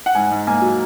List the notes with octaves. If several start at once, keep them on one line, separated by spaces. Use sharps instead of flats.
F#5
G#2 G#5
G#2
A#3 G#5
F#3